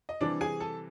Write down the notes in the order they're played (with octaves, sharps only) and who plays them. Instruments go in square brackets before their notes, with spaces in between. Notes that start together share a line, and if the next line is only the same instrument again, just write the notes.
[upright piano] D#5
C3 E3 G3 D4 D5
G#4 G#5
A4 A5